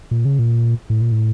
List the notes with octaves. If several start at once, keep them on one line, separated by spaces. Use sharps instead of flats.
A#2
C#3
A#2
A2
A#2
A2